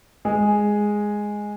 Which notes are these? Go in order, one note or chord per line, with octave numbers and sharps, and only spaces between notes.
G#3 G#4